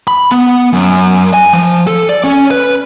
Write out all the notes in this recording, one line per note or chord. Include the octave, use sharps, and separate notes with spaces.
B5
B3
F#2
G#5
F3
A4
D5
C#4
B4